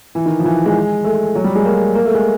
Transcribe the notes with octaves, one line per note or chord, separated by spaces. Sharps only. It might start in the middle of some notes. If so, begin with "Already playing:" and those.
E3
D#3
F3
E3
G#3
A3
F#3
G3
G#3
A#3
A#3
A3
G#3